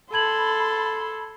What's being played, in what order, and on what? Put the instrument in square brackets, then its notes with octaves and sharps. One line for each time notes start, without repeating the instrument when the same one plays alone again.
[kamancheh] A4 C6 [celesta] A5 G#6 F#7 [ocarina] B5